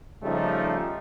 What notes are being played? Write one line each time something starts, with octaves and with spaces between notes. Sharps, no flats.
C#3 F3 G3 A3 D#4